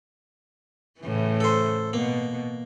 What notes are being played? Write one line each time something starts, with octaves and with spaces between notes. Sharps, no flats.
A2 C#3 E3
A4 C5
B2 A#3